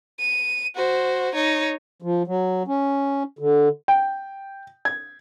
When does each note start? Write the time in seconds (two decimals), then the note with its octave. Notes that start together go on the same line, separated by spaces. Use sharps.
0.19 D#7
0.75 F#4 C5
1.34 D#4 C#5
2.02 F3
2.27 F#3
2.67 C#4
3.39 D3
3.88 G5
4.85 G#6